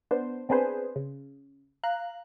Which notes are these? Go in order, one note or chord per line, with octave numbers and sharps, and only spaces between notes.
B3 D4 C5
B3 C4 D4 G#4 B4 C5
C#3
F5 A#5 F#6